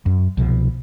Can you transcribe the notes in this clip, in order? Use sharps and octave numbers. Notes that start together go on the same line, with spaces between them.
F#2
C2 B2 F3